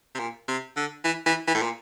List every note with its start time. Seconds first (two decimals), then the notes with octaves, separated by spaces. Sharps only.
0.15 C3
0.19 A#2
0.48 C3
0.76 D3
1.04 E3
1.26 E3
1.48 E3
1.55 A2
1.62 A#2